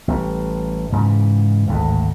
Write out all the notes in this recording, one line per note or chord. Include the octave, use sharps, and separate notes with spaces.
A1 G3
G#2 C#3 E3
G#1 D2 A2